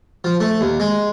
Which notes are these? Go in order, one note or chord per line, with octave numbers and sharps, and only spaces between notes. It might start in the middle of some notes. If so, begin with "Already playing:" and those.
F3
A3
D#2
G#3